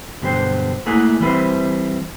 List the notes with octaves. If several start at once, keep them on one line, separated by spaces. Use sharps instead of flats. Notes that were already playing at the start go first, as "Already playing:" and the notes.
G2 B2 D3 F#3 C5 G5
A3 A#3 E4 G#4 A#4 F#5
E3 G3 C4 B4 C5 E5